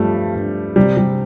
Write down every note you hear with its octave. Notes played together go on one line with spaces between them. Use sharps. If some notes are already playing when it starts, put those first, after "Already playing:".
Already playing: G2 F3 G3 A3
G2
C3 G3
G3